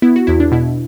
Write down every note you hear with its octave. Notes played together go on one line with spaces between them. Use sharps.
B3 E4
F#4
E2 E4
D4
B2 E4